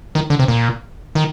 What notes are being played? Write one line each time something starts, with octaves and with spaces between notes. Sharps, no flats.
D#3
D3
C3
A#2
D#3